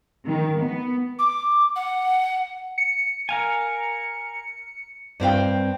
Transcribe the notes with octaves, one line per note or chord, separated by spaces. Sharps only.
D#3
B3
D6
F#5
C#7
A#4 F5 G#5
G2 C4 F5 G5